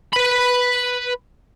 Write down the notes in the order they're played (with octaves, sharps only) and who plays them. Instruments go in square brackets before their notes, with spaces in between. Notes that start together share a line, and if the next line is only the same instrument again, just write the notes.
[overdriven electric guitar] B4 B5